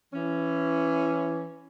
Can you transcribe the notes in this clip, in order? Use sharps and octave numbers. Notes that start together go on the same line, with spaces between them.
E3 C#4